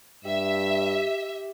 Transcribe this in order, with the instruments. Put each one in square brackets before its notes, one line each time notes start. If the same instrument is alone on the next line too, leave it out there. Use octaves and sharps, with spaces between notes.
[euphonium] G2 [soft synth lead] G4 [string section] E5